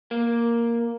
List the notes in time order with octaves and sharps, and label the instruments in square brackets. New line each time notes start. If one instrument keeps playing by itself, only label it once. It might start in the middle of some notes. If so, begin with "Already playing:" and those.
[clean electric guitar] A#3